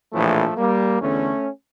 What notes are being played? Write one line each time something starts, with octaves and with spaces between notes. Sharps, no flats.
A#1 A2 E3 F3 A3
G3 A#3
E2 D3 A3 C#4